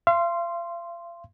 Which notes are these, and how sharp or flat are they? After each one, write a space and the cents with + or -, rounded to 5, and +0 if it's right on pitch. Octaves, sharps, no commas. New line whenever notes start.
F5 -40 C6 +0